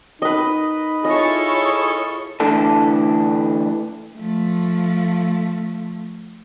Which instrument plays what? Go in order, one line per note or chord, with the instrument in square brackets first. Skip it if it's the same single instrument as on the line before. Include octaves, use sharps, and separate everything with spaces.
[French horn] D#4 [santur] B4 D#5
[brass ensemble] E4 G#4 A4 [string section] F4 C#5 C#6 [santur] D#5
[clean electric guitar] D3 E3 A3 D4 A4
[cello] F3 A3